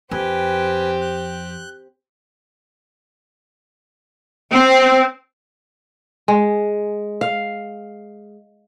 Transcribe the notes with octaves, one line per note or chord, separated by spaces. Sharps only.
F2 C4 G4 B4 G#5
F#6 G6
C4
G#3
F5